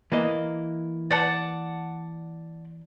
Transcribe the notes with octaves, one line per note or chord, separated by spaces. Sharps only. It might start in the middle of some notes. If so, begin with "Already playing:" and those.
E3 A#3 D#5
D5 F#5 A5